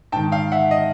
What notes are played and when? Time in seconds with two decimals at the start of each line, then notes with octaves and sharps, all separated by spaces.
0.12 G#2 D#3 G5 A5
0.32 F5 G5
0.52 E5 F#5
0.71 D#5